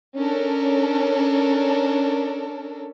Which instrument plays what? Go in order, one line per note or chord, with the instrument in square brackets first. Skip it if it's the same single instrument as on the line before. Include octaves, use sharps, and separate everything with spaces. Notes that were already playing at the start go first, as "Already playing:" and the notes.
[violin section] C#4 D4 A4 A#4